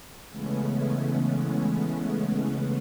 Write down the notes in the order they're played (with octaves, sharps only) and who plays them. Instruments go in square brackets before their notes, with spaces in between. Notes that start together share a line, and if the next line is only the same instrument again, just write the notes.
[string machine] C#3 E3 G#3 A3 B3 C#4